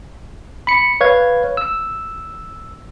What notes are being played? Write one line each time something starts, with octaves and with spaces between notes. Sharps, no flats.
B5 C#7
B4 C#5 F5 G#6
E6